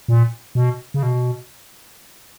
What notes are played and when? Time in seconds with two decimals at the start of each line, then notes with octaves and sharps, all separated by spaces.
0.08 A#2
0.55 B2
0.94 C#3
1.03 B2